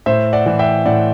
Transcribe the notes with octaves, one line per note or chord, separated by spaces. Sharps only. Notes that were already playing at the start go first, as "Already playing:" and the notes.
A2 C5 E5
D5 F#5
E3
E5 G5
A2 D5 F#5